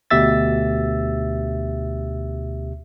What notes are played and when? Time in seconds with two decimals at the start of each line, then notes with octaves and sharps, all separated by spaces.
0.11 D2 B2 G4 E5 E6 A6